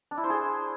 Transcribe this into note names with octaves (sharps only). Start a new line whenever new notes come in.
D4
E4
C5
G#4